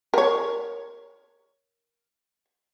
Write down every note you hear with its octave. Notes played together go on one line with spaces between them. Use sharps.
A#4 C#5